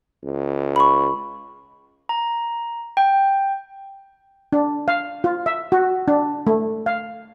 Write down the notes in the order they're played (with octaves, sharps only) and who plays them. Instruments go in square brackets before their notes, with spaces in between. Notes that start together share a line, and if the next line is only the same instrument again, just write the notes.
[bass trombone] C#2
[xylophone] B5 C#6
[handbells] A#5
G5
[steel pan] D4
F5
F4
E5
F#4
D4
A3
F5